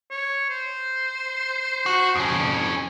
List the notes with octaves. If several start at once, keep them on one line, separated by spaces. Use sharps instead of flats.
C#5
C5
F#4
F2 C#4